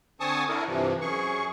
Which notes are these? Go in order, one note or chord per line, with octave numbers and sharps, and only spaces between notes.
D3 C4 G#5 A5 C#6 D#6
D4 E4 A4 A#4
G2 C3 E3 F3
F#2 G#4 C#6